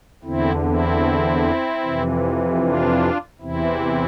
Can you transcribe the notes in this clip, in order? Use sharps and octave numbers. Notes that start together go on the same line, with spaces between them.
E2 D3 C4 E4
C4 E4
F2 C3 E3
D4 F4
E2 C3 E3 C4 E4